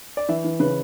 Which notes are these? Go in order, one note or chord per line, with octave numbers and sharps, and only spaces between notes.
D5
E3 E5
E3
C#3 B4